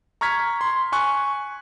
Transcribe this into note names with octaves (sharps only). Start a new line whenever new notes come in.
A#5 C#6 F6 G#6 B6
C6
G#5 C#6 F#6